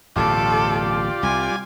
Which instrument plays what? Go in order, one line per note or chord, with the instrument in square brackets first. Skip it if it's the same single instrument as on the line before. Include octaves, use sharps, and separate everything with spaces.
[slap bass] D1 A1 B2 [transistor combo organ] F4 G4 D5 [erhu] A4
[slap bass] C2 [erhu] G#5